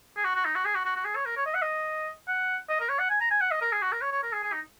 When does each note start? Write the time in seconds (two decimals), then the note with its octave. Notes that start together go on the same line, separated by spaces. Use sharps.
0.17 G#4
0.24 F#4
0.35 F#4
0.45 D#4
0.55 F#4
0.65 G#4
0.75 F#4
0.85 F#4
0.96 F#4
1.05 G#4
1.16 C#5
1.26 A#4
1.37 C#5
1.46 D#5
1.54 F#5
1.62 D#5
2.28 F#5
2.69 D#5
2.80 A#4
2.89 C#5
2.99 F#5
3.10 G#5
3.21 A#5
3.31 G#5
3.41 F#5
3.51 D#5
3.61 A#4
3.72 G#4
3.82 F#4
3.92 A#4
4.02 C#5
4.12 C#5
4.23 A#4
4.33 G#4
4.43 G#4
4.53 D#4